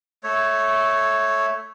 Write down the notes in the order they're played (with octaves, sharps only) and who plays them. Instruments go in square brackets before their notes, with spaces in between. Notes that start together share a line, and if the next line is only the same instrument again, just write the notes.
[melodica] A3 C#5